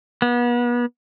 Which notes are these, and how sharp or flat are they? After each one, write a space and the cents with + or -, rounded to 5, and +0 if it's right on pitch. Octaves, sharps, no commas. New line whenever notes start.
B3 -35